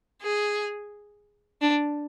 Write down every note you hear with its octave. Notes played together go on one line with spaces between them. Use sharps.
G#4
D4